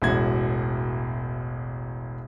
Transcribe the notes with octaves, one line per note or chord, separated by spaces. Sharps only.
E1 A1 F#4 G#6